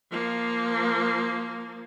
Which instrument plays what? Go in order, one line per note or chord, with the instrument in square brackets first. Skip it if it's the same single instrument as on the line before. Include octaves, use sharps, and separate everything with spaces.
[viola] F3 A#3